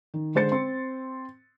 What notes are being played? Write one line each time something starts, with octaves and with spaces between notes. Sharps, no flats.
D#3
D3 G#3 C5 A6 C#7
C4 C6